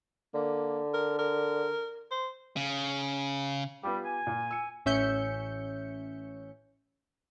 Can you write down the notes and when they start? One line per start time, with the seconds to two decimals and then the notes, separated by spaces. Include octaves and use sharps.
0.34 D3 A#3
0.94 A#4
1.19 A#4
2.11 C5
2.56 C#3
3.83 G3 B3 F4 G4
4.04 G#5
4.27 A#2
4.51 E6 C#7
4.85 A1 C#4 E5 G6 C#7